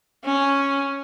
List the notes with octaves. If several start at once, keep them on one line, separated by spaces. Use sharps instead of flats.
C#4